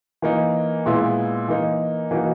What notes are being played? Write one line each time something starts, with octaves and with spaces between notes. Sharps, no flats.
E3 A#3 D#4
A#2 G#3 B3 E4
E3 A#3 D#4
E3 A#3 D#4 F#4